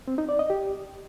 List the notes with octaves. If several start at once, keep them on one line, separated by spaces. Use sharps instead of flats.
C4
D#4
D5
D#5
G4